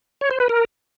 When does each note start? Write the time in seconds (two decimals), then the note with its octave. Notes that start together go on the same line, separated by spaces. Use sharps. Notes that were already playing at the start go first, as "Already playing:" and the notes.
0.21 C#5
0.31 C5
0.40 B4
0.49 A#4